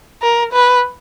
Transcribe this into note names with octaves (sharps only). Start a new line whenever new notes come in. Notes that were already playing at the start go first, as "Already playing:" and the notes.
A#4
B4